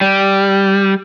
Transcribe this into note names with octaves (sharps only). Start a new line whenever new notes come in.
G3